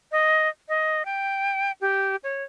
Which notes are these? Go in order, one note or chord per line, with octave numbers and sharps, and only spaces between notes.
D#5
D#5
G5
G4
C#5